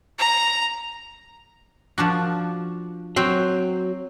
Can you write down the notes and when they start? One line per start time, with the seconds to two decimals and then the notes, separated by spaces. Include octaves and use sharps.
0.19 A#5
1.98 F3 D4 F#4
3.16 F#3 C4 F#4 C5